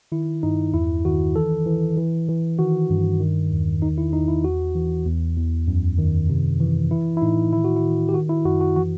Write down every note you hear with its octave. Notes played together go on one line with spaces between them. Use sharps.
D#3 E4
G2 D#4
E2 E4
D#3 F#4
E3 A4
E3
E3
E3
D#3 F#4
G2
D#3
E2
D#3 D#4
E4
E2 D#4
E4
E2 F#4
E3
E2
E2
F#2
D#3
C3
E3
E3 E4
E4
A2 D#4
D#3 E4
F#4
E4
D#3
G4
D#3 F#4
E4
F#2 F#4
F#4
E3 F#4